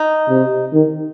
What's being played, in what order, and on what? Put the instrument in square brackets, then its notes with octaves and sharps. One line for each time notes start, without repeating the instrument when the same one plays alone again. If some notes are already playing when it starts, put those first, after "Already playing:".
Already playing: [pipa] D#4
[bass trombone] C3
D#3